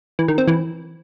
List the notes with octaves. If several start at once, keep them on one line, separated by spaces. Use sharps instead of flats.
E3
D#3
C4
E3